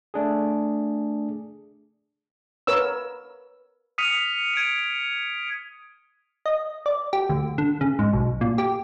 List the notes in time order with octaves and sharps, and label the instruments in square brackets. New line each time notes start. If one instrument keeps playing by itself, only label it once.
[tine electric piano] A3 D4 G#4
[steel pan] A#4 B4 C#5 E6
[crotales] D#6 F6 B6 C#7 D#7 F7
G#6 D7 D#7
[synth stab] D#5
D5
G4
D2
D3
C#3
G#2
B1
A#2
G4